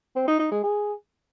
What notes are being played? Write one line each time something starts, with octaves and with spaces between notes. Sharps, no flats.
C4
D#4
D#4
G#3
G#4